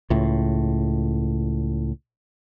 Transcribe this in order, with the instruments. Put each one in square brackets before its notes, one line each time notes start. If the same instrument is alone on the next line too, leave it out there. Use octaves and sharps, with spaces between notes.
[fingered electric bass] C#2 A2